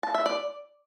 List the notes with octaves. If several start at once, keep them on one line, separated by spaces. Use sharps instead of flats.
A5
E5
D5